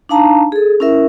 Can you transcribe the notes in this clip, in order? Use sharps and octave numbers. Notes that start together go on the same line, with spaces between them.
D4 D#4 F5 A5 A#5
G#4 A4
C#4 E4 A#4 E5